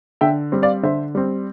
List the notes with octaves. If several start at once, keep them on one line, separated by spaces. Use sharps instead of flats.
D3 E5 G5
G3 C4
D5 F5
D3 C5 E5
G3 C4